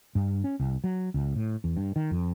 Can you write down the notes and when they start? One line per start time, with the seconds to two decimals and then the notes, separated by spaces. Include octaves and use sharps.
0.15 G2
0.44 C#4
0.60 C2
0.84 F#3
1.14 C#2
1.36 A2
1.64 E2
1.77 G2
1.96 D#3
2.11 F2